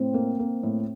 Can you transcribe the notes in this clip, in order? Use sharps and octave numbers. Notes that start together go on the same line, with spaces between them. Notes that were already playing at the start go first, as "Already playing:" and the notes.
Already playing: A2 C4
A#3
A#3
A2